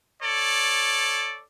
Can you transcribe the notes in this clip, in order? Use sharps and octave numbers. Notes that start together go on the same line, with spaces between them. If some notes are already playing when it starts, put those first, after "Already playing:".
A4 C#5 D5